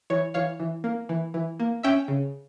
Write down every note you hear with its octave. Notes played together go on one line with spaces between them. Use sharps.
E3 C#5
E3 C#5 F5
E3
A#3
E3
E3
A#3
C#4 E5 G5
C#3